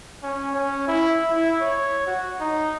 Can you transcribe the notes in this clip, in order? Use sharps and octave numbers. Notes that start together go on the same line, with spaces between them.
C#4
C#4
E4
E4
C#5
F#4
D#4